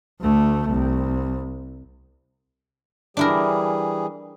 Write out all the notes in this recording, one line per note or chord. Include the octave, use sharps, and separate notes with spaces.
D2 A3
C2
E3 G3 D4 E4 G#4 A#4